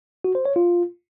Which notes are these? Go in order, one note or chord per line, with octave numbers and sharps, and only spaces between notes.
F#4
C5
C#5
F4